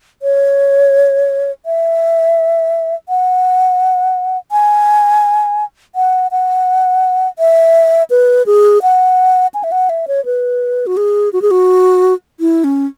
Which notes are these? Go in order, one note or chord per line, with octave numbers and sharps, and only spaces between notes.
C#5
E5
F#5
G#5
F#5
F#5
E5
B4
G#4
F#5
G#5
E5
F#5
E5
C#5
B4
F#4
G#4
F#4
G#4
F#4
E4
C#4